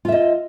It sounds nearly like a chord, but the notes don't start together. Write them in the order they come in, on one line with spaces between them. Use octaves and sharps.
F4 E5 D#5